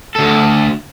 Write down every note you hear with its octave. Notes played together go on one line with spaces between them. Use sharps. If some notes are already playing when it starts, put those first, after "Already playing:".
D2 A4